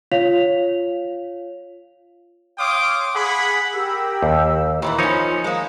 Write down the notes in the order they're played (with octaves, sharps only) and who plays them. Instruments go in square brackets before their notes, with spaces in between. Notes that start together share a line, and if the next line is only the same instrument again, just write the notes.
[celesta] F4 C#5 F5 F7
[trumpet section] C#5 F5 G5 C6 D6 D#6
G#4 F#5 B5
[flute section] G4 A#4 E6
[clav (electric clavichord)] D#2
[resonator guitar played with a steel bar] A#2 D3 E3 [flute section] A#4 B5
[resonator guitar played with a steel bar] F3 C#4 [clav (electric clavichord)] D#4 C#5
[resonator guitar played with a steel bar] G#3 A#3 [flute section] D#6